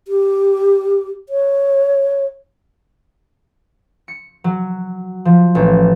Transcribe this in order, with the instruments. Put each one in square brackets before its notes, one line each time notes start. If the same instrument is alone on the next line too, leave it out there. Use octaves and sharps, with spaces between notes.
[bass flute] G4
C#5
[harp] C#7
F#3
F3
A1